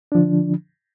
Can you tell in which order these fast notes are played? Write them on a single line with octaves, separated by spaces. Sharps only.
D4 F3 D3